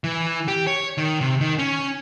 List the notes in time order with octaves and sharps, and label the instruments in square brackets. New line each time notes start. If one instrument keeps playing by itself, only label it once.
[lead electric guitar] E3
G4
C#5
D#3
C3
D#3
C#4